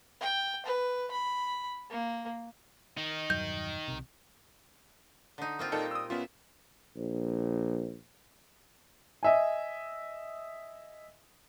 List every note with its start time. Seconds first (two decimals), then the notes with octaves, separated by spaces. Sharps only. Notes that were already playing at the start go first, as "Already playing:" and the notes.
0.20 G5
0.66 B4
1.11 B5
1.90 A#3
2.97 D#3 D#4
3.30 E1 G2 F#3 G6
3.88 B1 C3
5.38 D3 D#4
5.59 A#3 C4 F4
5.72 A#2 G3 D#4 A4 A#4 G5
5.91 D#6 E6
6.10 B3 C#4 F4 E5
6.96 A#1
9.23 D#5 E5 G#5